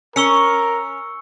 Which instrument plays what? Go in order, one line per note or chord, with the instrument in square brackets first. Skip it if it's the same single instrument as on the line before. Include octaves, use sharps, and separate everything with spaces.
[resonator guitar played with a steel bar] C#4 [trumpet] A#4 [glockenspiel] C#6 E6 C#7